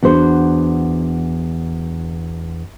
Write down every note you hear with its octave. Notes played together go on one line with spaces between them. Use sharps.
E2 D4 F#4 C5